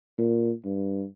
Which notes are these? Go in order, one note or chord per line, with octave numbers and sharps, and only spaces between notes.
A#2
G2